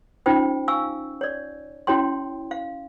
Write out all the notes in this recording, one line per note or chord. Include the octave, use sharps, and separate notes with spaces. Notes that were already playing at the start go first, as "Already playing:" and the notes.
C#4 D#4 F4 C5 G5
F5 G#5 C#6 E6
C#5 D5
C#4 E4 F#4 C#5 G5 C6
F5